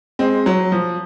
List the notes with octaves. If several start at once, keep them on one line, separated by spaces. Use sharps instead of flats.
G#3 C4
F#3
F3